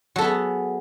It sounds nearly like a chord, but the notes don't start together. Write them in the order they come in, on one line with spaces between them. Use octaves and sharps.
F#3 A4 B3 G#4